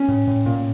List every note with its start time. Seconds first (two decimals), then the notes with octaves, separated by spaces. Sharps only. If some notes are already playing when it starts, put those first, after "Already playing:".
Already playing: C#4
0.08 A2
0.27 A2
0.46 A#2